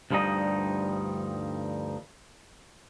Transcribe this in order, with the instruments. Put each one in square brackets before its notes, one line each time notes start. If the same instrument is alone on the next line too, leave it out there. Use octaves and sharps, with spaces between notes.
[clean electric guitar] D2 G2 F3 G3 D#4 D#5